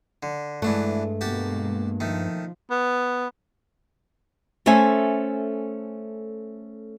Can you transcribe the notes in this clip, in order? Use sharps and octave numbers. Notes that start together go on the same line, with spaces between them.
D3
G2 E3 G#3 A3 D4 F#5
B2 G#3 A#3 F#4 G4 A5
D#3 F3 A3
B3
A3 C#4 A4 C5 E5 G#5